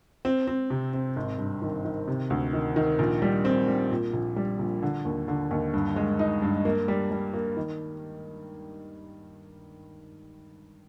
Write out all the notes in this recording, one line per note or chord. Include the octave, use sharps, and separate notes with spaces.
C4
C4
C3
C4
G#1
G2
D#3
D#3
C3
D2
D#3
D#3
A#1
G3
C4
G3
A#2
A#1
G3
A#1
D3
D#2
D3
D#2
G2
G#3
D#4
G2
A#3
G3
G3
A#3
D#3